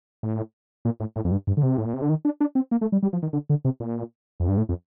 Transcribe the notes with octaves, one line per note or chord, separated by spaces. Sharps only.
A2
A#2
A2
A2
F2
G2
G2
D3
C3
A2
A#2
C3
D3
D#3
D4
D4
C4
A#3
A3
G3
G3
F3
D#3
D3
D3
C3
A#2
F2
G2
A2
F2